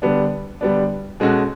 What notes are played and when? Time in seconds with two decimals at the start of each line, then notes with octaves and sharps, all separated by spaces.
0.02 D3 G3 B3 D4
0.61 D3 G3 B3 D4
1.20 B2 G#3 C#4 F#4 A4